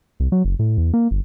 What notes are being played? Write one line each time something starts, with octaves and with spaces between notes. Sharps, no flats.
C2
F#3
F#1
A2
E2
A#3
G1